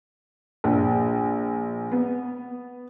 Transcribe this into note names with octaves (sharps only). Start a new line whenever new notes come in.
A#1
B3